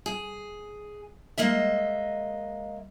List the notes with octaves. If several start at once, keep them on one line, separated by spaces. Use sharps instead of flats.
G#4
G#3 A#3 D#5 E5